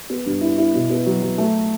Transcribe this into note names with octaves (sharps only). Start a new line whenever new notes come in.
B3
G2
E4
E4
B2
B3
F#3
F#3
A3